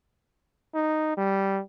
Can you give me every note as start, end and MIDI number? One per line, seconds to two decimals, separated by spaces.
0.75 1.15 63
1.17 1.61 55